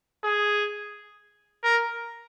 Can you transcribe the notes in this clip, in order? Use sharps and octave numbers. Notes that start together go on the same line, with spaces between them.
G#4
A#4